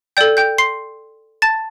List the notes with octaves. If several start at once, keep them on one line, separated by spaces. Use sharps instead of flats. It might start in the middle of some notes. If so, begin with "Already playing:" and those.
A4 D5 G5 G6
G5 G6
C6 C7
A5 A6